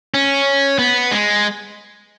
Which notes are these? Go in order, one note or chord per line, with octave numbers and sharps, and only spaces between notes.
C#4
B3
G#3